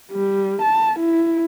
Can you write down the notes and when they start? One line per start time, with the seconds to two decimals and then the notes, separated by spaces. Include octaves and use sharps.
0.11 G3
0.61 A5
0.99 E4